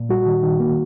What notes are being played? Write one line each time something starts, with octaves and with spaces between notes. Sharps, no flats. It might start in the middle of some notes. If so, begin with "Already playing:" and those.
Already playing: A#2
G3 F#4
D#3
D#3
A#3